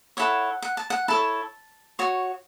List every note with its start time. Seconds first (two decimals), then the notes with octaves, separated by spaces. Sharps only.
0.17 E4 A4 C#5 F#5
0.62 F#5
0.77 A5
0.90 F#5
1.08 E4 A4 C#5 A5
1.99 F#4 C#5